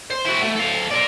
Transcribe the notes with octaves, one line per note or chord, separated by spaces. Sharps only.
C5
E4 F#4
A3
A4 F5
A#4 D5